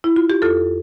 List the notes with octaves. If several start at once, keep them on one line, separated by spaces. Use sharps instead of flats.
E4
F4
G4
F2 F4 A4